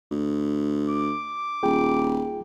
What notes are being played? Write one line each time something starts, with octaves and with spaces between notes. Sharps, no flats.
D2
D6
D#1 F4 G#4 G5